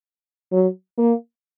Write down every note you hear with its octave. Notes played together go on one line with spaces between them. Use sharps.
F#3
A#3